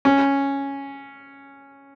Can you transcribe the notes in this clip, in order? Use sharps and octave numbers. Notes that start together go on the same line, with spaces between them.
C#4